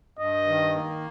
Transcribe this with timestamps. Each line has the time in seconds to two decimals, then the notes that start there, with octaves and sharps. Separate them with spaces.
0.19 G2 D#5
0.47 D#3
0.75 A#3